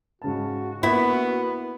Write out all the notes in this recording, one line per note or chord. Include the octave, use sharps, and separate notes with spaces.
G#2 C#3 F#4 A5
A#3 B3 E4